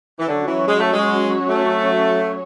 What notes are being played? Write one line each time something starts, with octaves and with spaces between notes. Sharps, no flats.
E3
D3 F#3 C#4 F#4 C#5
E3
G#3
A3
G#3
A3